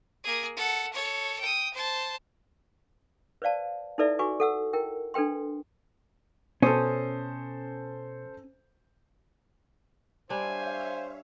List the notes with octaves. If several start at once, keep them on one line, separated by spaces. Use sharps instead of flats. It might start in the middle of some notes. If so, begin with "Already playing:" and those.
A#3 G#4
A4 F#5
A4 C#5
G5 D#6
C5 A5
B4 C5 D5 F5 A5
D#4 E4 A4 B4 D5 E5
F#4 B4 G#5 C#6 D6
A4 F#5 E6
E4 A#4 G5
D4 A4 B4 G5 C6
B2 C#4 A4 C5 D#6
G3 D4 C5 C#5 E5 F5 G#5